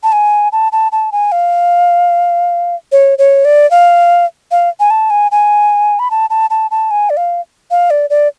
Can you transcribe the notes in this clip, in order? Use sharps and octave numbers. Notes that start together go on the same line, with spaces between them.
A5
G#5
A5
A5
A5
G#5
F5
C#5
C#5
D5
F5
F5
G#5
A5
G#5
G#5
B5
A5
A5
A5
A5
G#5
D5
F5
F5
D5
D5